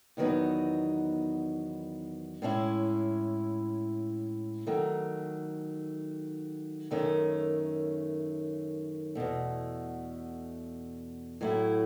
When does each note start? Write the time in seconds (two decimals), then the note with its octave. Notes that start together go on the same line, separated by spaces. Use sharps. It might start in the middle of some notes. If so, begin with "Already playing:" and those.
0.17 E2 D#3 F#3 B3 D#4
2.42 A2 G#3 C#4 E4
4.67 D#3 F#3 A3
6.91 F#2 D#3 A3 C#4
9.15 E2 B2 A3
11.41 A2 F#3 A3 E4